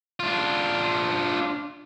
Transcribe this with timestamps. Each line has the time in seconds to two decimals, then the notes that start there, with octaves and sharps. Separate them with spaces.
0.20 D4 F4